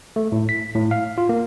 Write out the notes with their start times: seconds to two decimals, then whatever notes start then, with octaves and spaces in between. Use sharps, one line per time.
0.16 A3
0.32 A2
0.49 B6
0.75 A2
0.91 F5
1.18 F4
1.29 A#3